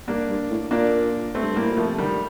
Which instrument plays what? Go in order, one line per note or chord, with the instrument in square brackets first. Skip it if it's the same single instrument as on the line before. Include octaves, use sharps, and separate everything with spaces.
[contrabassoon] G2 [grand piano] A#3 D4
[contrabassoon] G2
A2
[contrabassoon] A#2 [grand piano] A#3 D4
[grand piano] A3 C4
[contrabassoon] G2
[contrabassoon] A2 [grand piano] G3 A#3
[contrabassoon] A#2
[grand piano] F3 A3
[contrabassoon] C3
[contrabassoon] D3 [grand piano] D#3 G3